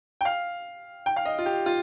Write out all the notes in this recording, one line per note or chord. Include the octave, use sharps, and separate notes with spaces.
G5
F5
G5
F5
D#5
F4
G4
F4